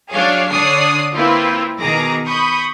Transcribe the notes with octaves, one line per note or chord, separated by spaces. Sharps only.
F#3 D4 G#4 C#5 F5
D3 D4 C#5 D5 D#6 C7
A#3 C4 E4 F4 B4
B2 D#3 G#4 A#5 D6 A#6
B5 C#6 D#6 G6